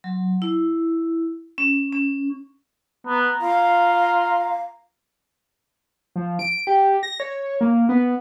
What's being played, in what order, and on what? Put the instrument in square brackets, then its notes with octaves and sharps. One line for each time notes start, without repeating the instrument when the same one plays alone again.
[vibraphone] F#3
E4
C#4
C#4
[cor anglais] B3 [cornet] A#5
[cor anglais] F4 [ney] F5
[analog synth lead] F3
D7
G4
A#6
C#5
A#3
B3